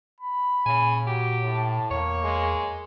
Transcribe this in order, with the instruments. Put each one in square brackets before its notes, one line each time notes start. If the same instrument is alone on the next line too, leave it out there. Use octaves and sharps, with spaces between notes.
[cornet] B5
[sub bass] A#2 [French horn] C#3 [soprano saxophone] G#5
[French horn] F#3 [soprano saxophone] G4
[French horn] A2 [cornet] A5
[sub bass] E2 [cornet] A#3 [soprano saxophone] C#5
[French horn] G#3